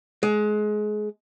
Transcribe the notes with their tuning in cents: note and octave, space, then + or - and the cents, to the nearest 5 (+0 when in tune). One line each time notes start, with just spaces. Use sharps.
G#3 +25